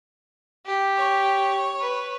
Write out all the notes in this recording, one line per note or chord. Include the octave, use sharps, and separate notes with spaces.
G4
C#5
B4